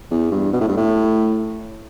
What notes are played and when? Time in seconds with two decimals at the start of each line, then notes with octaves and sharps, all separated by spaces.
0.11 E2
0.31 G2
0.53 B2
0.61 A2
0.69 G2
0.77 A2